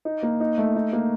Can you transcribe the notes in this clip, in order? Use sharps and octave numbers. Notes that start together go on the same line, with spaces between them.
D#4
A#3
D#4
A3
D#4
A#3